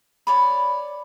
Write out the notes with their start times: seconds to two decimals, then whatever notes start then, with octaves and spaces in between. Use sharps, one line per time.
0.27 C#5 D5 B5